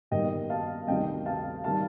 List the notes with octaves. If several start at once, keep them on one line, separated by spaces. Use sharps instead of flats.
G1 G2 D#3 G3 A#3 D#5 G5
F5 A5
D2 C3 D#3 G3 D#5 G5
F5 A5
D#3 G3 F5 A5